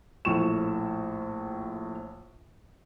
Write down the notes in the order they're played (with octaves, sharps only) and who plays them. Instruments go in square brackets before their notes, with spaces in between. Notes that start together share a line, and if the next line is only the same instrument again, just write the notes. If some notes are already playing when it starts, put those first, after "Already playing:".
[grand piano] A#1 A2 F3 C#6 E7